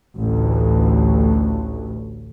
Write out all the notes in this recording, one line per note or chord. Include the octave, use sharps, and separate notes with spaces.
A1 D2